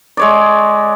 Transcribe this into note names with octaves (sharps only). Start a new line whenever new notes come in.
G#3 C#5 D5